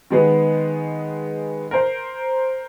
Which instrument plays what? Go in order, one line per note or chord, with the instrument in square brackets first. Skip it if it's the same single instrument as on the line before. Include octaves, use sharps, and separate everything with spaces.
[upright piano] D#3 G#3 B3
A#4 C5